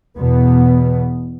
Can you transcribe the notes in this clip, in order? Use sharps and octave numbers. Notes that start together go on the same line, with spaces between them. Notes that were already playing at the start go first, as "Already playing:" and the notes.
E2 B2 B3